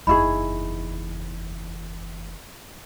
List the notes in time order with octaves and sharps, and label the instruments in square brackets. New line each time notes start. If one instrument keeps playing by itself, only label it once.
[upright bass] F#1 E2 [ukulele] D#4 E4 G#4 [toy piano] B5 C#6